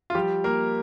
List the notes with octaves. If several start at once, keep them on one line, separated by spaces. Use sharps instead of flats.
F4
F3 G3 G4
A#3 A#4